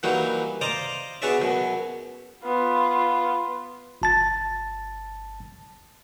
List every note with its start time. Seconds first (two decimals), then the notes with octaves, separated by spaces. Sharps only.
0.03 E3 F#3 G3 A#3 D#4 F#4
0.61 C5 D5 D#5 F5 A#5 D6
1.22 B3 F#4 G#4 C#5 D5 E5
1.42 F#2 B2
2.44 B3 F4
4.02 G1 A5 A6